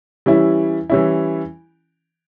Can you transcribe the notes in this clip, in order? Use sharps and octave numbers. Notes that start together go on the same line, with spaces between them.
E3 G3 C#4 E4
E3 G3 C#4 E4